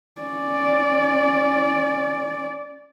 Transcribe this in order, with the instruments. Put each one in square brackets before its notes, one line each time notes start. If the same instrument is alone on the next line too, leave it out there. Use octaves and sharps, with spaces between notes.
[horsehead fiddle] C#4 D5